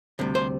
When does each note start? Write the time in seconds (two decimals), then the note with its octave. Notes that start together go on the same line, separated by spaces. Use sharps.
0.19 D2 C3 G3
0.35 C5